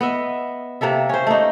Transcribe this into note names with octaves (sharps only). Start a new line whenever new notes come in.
B3 D#5 E5
C3 A#3 A4 E5
C#4 C5
A3 A#3 D#4